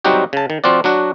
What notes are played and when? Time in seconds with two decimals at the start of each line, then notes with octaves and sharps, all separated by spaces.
0.05 F#3 G3 C4 D#4 F#4 G4
0.33 C#3 A5
0.50 D#3
0.64 F3 C4 F4 F#4 D5
0.84 F#3 D4 F#4